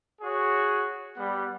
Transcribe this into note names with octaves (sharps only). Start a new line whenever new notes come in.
F#4 G#4 C#5
G3 B3 F#5